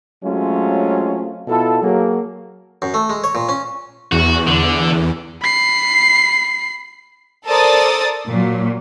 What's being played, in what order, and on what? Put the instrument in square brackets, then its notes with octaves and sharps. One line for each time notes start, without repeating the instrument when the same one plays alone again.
[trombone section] F#3 G#3 A3 C4 C#4 F4
B2 E4 F4 A4
F#3 A#3 G#4
[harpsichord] F#2
A3
G#3
C#5
A#2
C#4
[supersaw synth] E2 [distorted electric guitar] F#4
[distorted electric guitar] D3
[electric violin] B5 C7
[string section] A4 A#4 C5 D5 D#6 A6
A#2 F#3